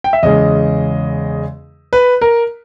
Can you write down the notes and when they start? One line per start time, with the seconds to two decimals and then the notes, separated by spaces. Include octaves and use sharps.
0.04 G5
0.13 E5
0.23 E2 C#3 G#3 D#5
1.93 B4
2.21 A#4